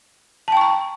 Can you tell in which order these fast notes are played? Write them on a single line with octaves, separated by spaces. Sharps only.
A5 G5 C#6 A#5